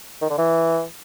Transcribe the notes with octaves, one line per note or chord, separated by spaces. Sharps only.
D#3
D3
E3